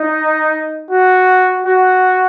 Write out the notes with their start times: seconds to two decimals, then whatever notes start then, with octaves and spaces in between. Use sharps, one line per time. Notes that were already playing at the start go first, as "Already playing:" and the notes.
Already playing: D#4
0.91 F#4
1.66 F#4